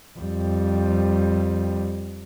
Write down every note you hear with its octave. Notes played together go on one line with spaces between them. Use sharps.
F2 G3